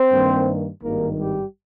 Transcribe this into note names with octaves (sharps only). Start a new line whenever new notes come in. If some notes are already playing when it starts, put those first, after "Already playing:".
Already playing: C4 C5
G2 D#3 G3 A#3
G#1 G2 D#3 G3 A#3 A#4
G3 G4